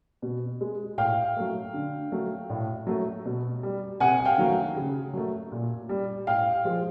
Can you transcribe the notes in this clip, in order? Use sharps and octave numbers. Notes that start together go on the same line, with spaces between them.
B2
G#3
A2 F5 G5
F#3 A3
D3
F#3 A3
A2
F#3 A3
B2
G3
C3 F#5 G#5
F#5
F5 G5
D#3 F#3 A3
C#3
F#3 A3
A#2
G3
A2 F5 G5
F3 G#3